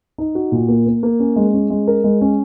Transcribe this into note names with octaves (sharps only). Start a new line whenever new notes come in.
D#4
F#4
A#2
A#3
A#3
A#3
C#4
G#3
C#4
G#3
A#4
G#3
C#4